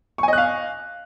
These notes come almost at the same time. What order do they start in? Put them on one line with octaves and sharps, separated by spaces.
C#6 G#5 D#5 F#6 F5